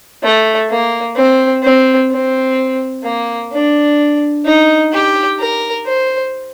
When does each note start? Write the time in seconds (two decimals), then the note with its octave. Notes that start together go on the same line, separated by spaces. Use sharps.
0.23 A3
0.69 A#3
1.16 C4
1.63 C4
2.11 C4
3.03 A#3
3.51 D4
4.45 D#4
4.92 G4
5.39 A#4
5.86 C5